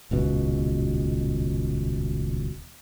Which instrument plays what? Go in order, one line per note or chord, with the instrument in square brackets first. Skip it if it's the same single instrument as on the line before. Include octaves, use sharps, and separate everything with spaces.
[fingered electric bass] D#1 C#2 B2